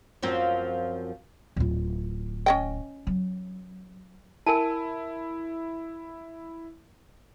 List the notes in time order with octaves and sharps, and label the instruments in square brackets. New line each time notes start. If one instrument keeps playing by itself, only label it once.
[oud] F#2 F3 C4
[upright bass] D1 F4
[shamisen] C#4 D#5 G5
[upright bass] F#3
[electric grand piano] E4 [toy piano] A#4 G#5 A5